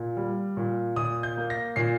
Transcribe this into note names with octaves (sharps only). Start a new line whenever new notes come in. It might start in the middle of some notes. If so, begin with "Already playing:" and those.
Already playing: A#2
G3
A#2
A#2 D#6
G6
A#3
A#6
A#2 C7